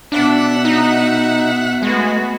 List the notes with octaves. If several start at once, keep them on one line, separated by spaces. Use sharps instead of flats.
B2 D4 E5 F#5
D#4
G#3 A3 B3 F#4